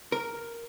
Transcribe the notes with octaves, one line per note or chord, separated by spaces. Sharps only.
A#4